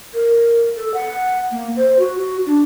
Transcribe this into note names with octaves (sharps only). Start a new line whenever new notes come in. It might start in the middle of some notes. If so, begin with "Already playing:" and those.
A#4
A4
F#5
A#3
C5
F#4
F#4
D4